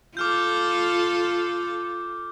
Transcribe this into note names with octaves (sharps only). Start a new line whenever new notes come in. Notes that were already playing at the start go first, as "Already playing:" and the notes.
F4 A4 D6 F6 G6